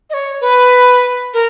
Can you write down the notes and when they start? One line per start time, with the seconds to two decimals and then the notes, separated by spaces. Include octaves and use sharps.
0.10 D#5
0.14 C#5
0.41 B4
1.34 A#4